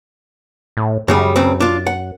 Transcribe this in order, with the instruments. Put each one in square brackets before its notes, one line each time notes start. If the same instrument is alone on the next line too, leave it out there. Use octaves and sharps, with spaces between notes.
[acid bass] A2
[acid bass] F#2 [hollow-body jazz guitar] C#3 G3 G#3
[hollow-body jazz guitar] C#2 C#3 C4
D4 F4
F#5